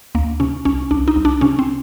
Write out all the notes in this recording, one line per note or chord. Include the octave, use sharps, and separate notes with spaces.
D2 A#3
C3 C#4
C2 C#4
C2 D4
D#4
C2
D4
C3 C#4
C4